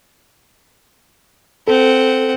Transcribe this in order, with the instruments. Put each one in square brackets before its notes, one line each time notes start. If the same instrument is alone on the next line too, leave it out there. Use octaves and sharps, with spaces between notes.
[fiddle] C4 F#5 [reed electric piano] A4